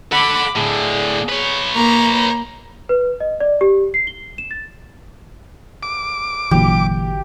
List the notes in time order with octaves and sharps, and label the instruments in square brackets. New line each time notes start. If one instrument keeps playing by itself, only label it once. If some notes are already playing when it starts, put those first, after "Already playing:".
[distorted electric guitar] A4 F#5 [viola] B5 D6
[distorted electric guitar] A2 D3 [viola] G#4
[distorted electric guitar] B4 C#5
[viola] A#3 A#5
[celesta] B4
D#5
D5
G4
C7
G7
E7
A6
[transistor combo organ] D6
[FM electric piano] G#1 D3 F#3 [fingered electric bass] A#2 E3 [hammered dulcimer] G4